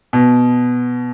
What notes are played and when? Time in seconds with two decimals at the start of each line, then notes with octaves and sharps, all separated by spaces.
0.13 B2